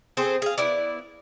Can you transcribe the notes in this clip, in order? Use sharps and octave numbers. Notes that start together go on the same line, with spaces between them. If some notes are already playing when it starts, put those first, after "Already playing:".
C4 G#4 A4 C5
G#4 F5
B3 E4 D5